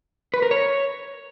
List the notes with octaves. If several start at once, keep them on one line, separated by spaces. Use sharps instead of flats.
B4
A#4
C#5